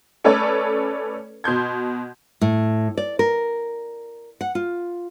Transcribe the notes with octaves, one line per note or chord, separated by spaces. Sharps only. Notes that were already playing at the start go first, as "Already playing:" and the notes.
A3 C#4 A4 B4 C#5 D5
B2 C6 G6 G#6
A2
D5
A#4
F#5
F4